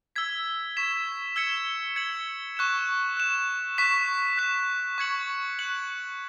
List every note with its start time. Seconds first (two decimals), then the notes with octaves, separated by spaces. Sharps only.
0.16 E6 G#6 B6
0.77 C#6 G#6 B6 E7
1.36 E6 G#6 C#7 E7
1.96 G#6 C#7 F#7
2.57 C#6 F#6 E7
3.17 F#6 E7
3.78 C#6 F#6 B6 E7
4.37 F#6 B6 E7
4.98 C#6 G#6 C#7 F#7
5.59 F#6 C#7 F#7